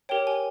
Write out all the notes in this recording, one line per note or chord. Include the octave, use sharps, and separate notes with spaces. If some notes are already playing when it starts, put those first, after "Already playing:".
G4 A#4 C#5 G5
G#5